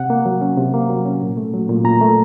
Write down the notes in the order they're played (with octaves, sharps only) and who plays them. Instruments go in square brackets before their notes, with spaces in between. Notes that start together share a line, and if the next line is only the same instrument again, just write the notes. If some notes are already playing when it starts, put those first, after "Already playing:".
Already playing: [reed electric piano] C3 F#5
A#3
F#3
C#4
C3
A#3
F#3
C#4
A#2
A3
F#3
A#2
A#2 A#5
A3